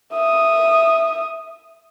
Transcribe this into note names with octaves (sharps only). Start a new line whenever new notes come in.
E5 D#6